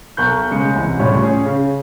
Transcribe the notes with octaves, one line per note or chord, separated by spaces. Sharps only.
B1 A#4 C#6 F#6 G6
C#3 G#3 C#7
C2 E3
C#2 A2 G3 C#5
C#4 G#4
C#3